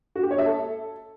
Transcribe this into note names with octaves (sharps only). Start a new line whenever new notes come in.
F#4
G4
C#5
E5
A4